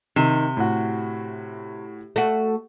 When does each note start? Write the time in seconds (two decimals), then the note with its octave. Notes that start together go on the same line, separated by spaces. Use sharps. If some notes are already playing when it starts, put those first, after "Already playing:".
0.16 C3 D#3
0.57 A2 F#4
2.16 A3 F#4